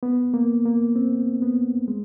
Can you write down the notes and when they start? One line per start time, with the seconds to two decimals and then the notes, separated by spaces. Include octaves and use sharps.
0.03 B3
0.34 A#3
0.66 A#3
0.96 C4
1.42 B3
1.88 G#3